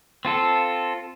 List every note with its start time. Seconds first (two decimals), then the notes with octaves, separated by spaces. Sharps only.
0.25 C4 F4 A4